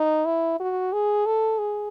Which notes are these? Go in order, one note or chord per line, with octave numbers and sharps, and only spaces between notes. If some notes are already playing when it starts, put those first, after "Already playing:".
Already playing: D#4
E4
F#4
G#4
A4
G#4